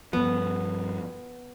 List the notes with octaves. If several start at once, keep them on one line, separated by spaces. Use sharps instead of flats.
G2 F3 B3